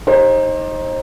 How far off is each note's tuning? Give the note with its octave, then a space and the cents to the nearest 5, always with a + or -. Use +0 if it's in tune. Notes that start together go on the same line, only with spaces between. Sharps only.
D#4 +0 G4 +20 C5 +35